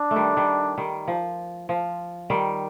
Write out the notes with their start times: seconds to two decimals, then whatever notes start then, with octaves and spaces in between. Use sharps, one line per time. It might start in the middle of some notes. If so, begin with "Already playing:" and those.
Already playing: D4
0.11 A3
0.16 D#3 G3
0.37 D#3 G3
0.77 D#3 G3
1.08 F3
1.69 F3
2.30 D#3 G3